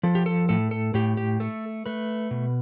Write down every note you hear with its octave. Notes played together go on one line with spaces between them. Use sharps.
F3 A4
G4
A4
A2 A4
A4
A2 G4
G4
A3 A4
A3 B4
B2